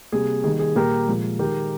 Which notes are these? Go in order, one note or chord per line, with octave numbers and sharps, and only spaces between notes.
C3 G3 A#3 G#4
D#3 G3 A#3 G#4
G#4
A#2 G3 A#3 G4 A#4
A#2 F3 G#3
D#3 G#3 G4 A#4